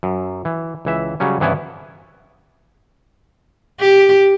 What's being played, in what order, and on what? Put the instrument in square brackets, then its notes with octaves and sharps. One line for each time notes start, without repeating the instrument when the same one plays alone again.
[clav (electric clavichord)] F#2
E3
C#2 E3 E5
C#3 F#3 G3 C#4
G2 C3 E3 B3 C#4 E4
[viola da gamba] G4